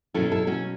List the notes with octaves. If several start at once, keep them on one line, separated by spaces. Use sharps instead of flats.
B2 F#3 C#4 E4 A4
E4 A4
C#4 F#4